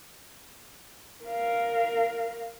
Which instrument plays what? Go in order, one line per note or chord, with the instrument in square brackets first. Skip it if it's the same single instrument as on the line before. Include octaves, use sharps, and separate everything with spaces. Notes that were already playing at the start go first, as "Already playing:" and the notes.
[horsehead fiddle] A#4 F5